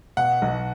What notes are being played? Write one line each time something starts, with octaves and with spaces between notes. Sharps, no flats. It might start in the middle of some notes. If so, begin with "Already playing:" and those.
B2 F#5
B1